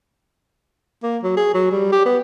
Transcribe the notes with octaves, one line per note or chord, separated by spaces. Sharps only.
A#3
F#3
G#4
F#3
G3
G4
B3